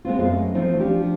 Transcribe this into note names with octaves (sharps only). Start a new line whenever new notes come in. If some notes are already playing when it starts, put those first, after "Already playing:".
G#3 B3 C4 F4
F#2 A3 B4 D#5 F5
E3 F3 A3 C4 D#4
F3 D4 G4